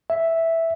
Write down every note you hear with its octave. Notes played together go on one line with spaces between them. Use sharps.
E5